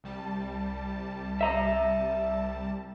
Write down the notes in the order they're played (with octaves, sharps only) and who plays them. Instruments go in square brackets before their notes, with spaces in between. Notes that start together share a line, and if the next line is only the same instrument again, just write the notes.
[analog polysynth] C2 G3 A5
[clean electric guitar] E5 A#5